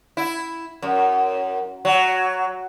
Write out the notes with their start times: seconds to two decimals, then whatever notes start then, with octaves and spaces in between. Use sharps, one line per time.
0.17 E4
0.82 F#2
1.85 F#3